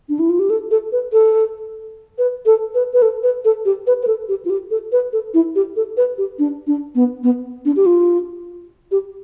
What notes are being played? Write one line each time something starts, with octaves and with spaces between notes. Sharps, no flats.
D4
E4
F4
G4
A4
A4
B4
A4
B4
A4
B4
B4
A4
B4
A4
G4
B4
B4
A4
G4
F4
G4
A4
B4
A4
E4
G4
A4
B4
G4
D4
D4
B3
B3
D4
G4
F4
G4